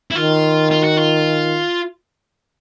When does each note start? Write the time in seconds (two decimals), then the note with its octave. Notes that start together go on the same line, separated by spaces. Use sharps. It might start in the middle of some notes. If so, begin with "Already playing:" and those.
0.11 E4
0.15 D#3 F4
0.71 F4
0.84 F#4
0.97 F4